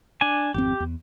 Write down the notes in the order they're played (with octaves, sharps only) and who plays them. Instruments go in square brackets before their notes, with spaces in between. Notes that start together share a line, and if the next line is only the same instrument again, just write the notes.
[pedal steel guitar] D4 G#5
[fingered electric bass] G#1 F2 C4 [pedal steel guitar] G4
[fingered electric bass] E2